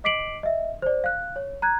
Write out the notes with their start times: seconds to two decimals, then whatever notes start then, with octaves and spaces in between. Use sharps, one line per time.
0.04 D#5 D6 B6 C7 D7 F#7
0.43 D#5 E5
0.82 C5 D5
1.04 F5 F#6
1.36 C#5
1.62 A#5 F#6 G#6